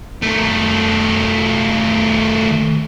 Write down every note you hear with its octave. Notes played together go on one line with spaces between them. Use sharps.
D#3 A3